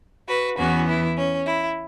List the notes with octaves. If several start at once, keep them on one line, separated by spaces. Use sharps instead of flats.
F#4 B4
E2 E3 B3 C#4 F#4
E4
C#4
E4